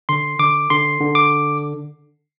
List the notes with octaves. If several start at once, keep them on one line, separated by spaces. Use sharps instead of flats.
D3 C6
D3 D6
D3 C6
D3
D6